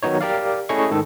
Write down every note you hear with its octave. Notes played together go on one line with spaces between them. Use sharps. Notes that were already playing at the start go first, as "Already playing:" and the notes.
D#3 F#3 B3 D#4 C#5
G4 A#4 D5 F5
A3 C#4 E4 G#4 D#5 C#6
G#2 D#3 A4